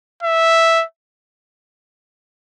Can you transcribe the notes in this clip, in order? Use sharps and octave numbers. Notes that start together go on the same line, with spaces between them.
E5